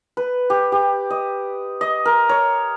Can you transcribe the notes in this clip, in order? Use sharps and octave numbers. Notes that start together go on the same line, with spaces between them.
B4
G4
G4
D#5
D#5
A#4
C#5